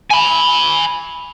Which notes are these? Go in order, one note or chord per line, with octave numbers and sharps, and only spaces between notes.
G#5 B5